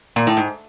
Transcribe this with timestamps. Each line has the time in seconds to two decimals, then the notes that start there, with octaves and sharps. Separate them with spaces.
0.16 A#2
0.27 A2
0.37 G#2